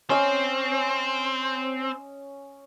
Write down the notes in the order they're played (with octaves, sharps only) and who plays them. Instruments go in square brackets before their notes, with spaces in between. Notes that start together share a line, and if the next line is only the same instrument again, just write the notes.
[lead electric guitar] C4 [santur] C#4 D#5